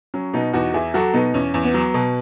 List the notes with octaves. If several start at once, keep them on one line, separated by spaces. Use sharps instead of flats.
F#3 C#4
B2 B3 D#4
E2 D#4 F#4
E2 E4 G#4
F#3 F#4 A4
B2 B3 D#4
E2 C#4
E2
B3
F#3
B2